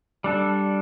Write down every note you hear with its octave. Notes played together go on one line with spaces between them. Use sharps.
G3 D4 A4